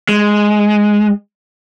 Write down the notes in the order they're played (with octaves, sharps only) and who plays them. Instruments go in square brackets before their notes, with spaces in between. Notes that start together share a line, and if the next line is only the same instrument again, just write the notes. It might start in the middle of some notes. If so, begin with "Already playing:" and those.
[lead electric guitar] G#3